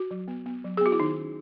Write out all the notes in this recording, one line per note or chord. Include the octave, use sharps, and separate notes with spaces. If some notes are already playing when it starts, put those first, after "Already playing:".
Already playing: F#4
F#3
B3
B3
F#3
G#4
B3 F#4
E4
D#3 D#4
C#4